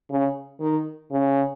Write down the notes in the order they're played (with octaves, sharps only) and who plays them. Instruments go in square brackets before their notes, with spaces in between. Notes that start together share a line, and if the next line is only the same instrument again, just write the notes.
[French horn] C#3
D#3
C#3